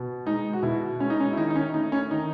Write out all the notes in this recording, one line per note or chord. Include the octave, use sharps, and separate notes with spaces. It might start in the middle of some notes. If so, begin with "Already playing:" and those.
Already playing: B2
G#3 D#4
F#4
B2 E4
G#3 C#4
D#4
C#4
E4
D#3 D#4
D#4
C#4
A3 D#4
C#4
D#3 D#4